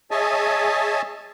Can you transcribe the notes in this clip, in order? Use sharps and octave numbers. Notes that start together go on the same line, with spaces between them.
G#4 C#5 D#5 E5 G#5 A5